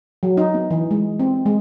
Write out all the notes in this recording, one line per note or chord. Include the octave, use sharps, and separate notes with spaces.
F#3
D#4
B3
E3
G#3
C4
G#3